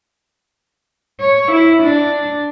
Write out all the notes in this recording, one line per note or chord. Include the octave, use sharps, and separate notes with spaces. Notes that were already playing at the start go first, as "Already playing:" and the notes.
C#5
E4
D4